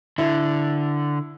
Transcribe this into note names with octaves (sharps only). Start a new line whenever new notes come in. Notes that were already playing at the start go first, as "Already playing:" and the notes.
D3 E4